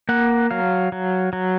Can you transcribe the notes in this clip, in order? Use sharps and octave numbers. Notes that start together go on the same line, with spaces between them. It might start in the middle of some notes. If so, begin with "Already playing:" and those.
A#3 F#5
F#3 F5
F#3
F#3